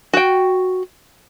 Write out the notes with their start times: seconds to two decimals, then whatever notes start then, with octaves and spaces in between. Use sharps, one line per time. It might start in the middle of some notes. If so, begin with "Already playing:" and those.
0.14 F#4 G5